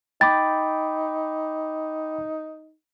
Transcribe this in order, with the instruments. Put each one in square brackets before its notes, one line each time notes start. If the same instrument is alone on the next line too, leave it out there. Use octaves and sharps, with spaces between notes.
[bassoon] D#4 [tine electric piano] G5 B5 D6 [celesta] A6